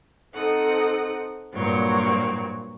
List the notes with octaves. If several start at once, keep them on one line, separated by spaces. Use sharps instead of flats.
C4 D#4 A4 F#5 D#6
G2 A#2 F#3 C4 C#5